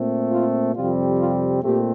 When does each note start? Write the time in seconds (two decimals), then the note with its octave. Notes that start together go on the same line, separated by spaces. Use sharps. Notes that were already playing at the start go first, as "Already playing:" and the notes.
Already playing: A#2 A3 C4
0.31 F4
0.75 F2 C3 G3 C4 F4
1.19 F4
1.63 A#2 A3 C4 G4